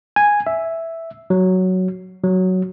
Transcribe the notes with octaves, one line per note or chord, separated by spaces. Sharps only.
G#5
E5
F#3
F#3